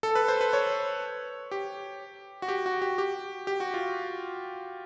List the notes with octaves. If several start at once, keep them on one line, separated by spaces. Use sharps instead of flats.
A4
B4
C5
B4
C#5
G4
F#4
G4
F#4
G4
G4
G4
F#4
F4